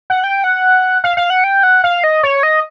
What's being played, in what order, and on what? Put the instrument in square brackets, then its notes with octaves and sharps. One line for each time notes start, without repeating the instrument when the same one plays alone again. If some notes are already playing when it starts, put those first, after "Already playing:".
[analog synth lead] F#5
G5
F#5
F5
F5
F#5
G5
F#5
F5
D#5
C#5
D#5